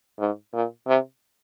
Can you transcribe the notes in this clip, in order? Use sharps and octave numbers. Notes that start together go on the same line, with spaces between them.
G#2
A#2
C3